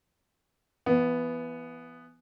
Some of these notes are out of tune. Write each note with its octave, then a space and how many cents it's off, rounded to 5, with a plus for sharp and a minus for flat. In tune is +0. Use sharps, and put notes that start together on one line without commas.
E3 +35 B3 +0